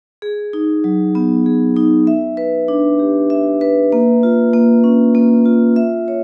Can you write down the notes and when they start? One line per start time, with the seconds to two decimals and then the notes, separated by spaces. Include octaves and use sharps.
0.22 G#4
0.53 D#4
0.84 F#3
1.15 B3
1.46 G#4
1.76 D#4
2.07 E5
2.37 B4
2.68 D4
2.99 G4
3.30 E5
3.61 B4
3.92 A#3
4.23 F4
4.54 A#3
4.84 C#4
5.15 A#3
5.45 F4
5.76 E5
6.08 C#5